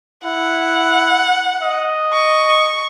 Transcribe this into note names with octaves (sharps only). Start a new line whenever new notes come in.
E4 F#5
D#5
C#6